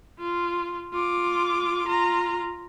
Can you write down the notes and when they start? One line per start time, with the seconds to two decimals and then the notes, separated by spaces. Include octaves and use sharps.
0.19 F4
0.92 F4 D6
1.86 F4 A#5